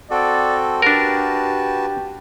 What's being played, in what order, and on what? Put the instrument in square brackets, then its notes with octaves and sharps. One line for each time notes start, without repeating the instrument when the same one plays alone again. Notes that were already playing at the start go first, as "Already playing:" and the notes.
[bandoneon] C4 F#4 A4 [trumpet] D5
[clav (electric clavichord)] D4 A#4 [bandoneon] F#4 B4 A5 [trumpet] G4